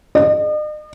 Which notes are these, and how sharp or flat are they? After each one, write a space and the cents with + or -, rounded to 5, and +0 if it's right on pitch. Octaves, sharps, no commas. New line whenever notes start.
D#5 -45